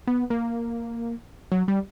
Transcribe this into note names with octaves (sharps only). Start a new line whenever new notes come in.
B3
A#3
F#3
G3